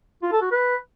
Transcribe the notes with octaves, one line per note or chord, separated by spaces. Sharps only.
F4
A4
F#4
B4